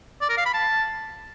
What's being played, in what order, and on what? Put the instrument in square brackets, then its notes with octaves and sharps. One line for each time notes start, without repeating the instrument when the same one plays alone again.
[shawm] D5
A#4
F5
B5
A5